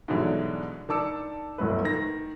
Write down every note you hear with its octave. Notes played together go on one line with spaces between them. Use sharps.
G#2 B2 D3 E3 F#3 G3
D#3 D4 A5 D6 E6 C#7
D1 G1 F#3 B3 B4
D#3 A#6